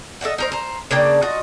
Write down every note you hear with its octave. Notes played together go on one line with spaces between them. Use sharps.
A4 D#5 E5 F#5
D#4 A#4 C5
C5 A#5
C#3 A#3 D4 G5
F4 F#4 D#5